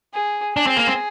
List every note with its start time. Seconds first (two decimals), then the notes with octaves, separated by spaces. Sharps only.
0.14 G#4
0.56 D4 G#4
0.67 C4
0.77 A#3
0.87 C4